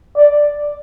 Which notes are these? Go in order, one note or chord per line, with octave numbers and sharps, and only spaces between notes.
D5